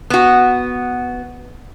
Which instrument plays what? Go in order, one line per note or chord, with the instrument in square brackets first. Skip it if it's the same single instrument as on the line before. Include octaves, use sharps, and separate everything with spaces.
[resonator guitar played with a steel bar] B3 F#4